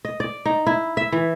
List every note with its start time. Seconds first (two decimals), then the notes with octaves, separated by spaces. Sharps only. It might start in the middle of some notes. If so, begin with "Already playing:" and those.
0.05 D#5
0.20 D5
0.46 D#4
0.67 E4
0.97 E5
1.12 E3